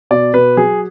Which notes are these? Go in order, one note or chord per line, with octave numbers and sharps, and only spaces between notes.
B2 D5
B2 B4
F#3 G#4